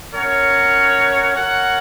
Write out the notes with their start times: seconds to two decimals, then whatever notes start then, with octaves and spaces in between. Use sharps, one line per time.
0.14 C#4 A#4 C#5 F#5
1.34 F#4 A#4 C#5 F#5